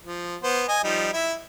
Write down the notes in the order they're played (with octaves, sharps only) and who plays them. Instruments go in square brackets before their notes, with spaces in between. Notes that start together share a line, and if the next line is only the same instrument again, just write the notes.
[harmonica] F3
B3 C5
D#5 G#5
F3 G3 D#4
E4 E5